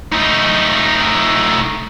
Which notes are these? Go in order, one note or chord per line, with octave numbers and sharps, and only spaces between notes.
A3 D#4